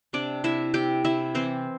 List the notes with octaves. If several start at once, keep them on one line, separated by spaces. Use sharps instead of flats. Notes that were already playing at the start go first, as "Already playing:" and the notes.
C3 D4 D5
C3 E4 E5
C3 G4 G5
C3 E4 E5
E3 C4 C5